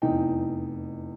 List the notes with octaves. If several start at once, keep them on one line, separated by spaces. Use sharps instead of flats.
F1 E2 E3 D#4 D#5 G5